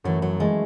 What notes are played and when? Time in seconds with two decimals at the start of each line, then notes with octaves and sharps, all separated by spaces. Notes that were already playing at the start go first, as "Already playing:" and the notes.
0.04 F#2 E3 F#3 A3
0.22 F#3
0.40 E3 G#3 A3